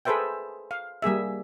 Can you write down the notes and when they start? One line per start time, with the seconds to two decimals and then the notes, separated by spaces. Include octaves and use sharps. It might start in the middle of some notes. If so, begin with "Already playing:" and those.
0.05 G#4 A4 B4 C5 E5 G5
0.71 F5
1.02 G3 A#3 G#4 E5